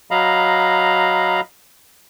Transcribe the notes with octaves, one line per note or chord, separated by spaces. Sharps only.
F#3 D#5 F5 A#5 B5